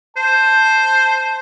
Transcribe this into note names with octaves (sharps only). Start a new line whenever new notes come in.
C5 A5